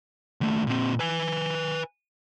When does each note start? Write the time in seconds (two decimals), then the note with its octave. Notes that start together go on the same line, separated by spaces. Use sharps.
0.41 D#2 A3
0.67 A#2 C4
1.00 B4 G#5